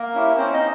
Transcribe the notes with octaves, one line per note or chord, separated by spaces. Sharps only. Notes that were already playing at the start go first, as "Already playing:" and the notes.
Already playing: A#3 A#4
C#4 E4 G4
C4 C#4 C5
D#4 D#5